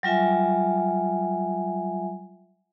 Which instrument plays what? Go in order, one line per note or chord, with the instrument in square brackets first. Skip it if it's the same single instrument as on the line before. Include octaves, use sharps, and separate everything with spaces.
[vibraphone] F#3 G3 F4 E5 G#5